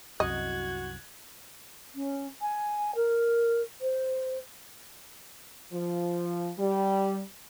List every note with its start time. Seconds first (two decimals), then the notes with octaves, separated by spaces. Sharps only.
0.20 C2 F#2 F#4 D#5 F#6 G#6
1.95 C#4
2.41 G#5
2.95 A#4
3.81 C5
5.73 F3
6.59 G3